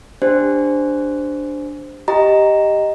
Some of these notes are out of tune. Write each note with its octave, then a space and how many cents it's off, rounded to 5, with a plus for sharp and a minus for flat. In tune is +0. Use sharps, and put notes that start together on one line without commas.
D4 +0 G4 +25 C5 -5
G4 +0 D#5 +0 A#5 +0